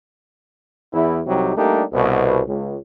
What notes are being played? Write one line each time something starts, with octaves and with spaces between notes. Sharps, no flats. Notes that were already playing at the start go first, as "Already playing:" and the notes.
E2 E4
C2 C3 F#3 G3 D#4 G4
G3 A3 A#3 D4 D#4 G4
C2 B2
C#2